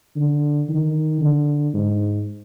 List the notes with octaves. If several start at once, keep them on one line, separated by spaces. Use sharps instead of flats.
D3
D#3
D3
G#2